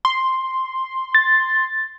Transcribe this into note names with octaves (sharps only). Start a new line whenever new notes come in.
C6
A6